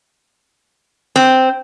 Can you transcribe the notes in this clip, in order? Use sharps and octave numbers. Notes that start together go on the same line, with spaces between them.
C4